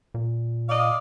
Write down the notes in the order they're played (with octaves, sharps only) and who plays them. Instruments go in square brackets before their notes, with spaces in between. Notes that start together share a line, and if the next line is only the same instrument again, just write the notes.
[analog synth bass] A#2
[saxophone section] D5 D#5 F5